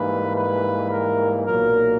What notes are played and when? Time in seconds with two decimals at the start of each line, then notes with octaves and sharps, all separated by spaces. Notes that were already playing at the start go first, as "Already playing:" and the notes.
Already playing: G#2 E3 G3 A#3 B4
0.37 B4
0.92 A#4
1.45 B1 A#2 F#3 A#3 A#4